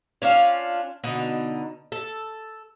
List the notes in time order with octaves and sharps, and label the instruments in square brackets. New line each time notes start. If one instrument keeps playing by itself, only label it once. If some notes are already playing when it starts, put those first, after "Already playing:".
[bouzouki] C#4 D4 E4 F4
B2 D3 D#4
A4